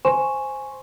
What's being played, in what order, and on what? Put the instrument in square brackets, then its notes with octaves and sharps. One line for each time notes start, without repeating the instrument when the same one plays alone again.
[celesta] C5 G#5 C6 C#6 E7